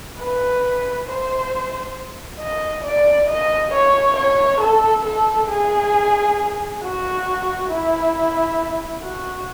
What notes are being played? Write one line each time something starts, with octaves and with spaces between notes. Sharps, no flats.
B4
C5
D#5
D5
D#5
C#5
C#5
A4
A4
G#4
F#4
E4
F#4